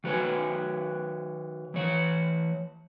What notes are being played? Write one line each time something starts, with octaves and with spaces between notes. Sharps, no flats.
D#3 F#4 B4 C#5 G#5
E3 C#5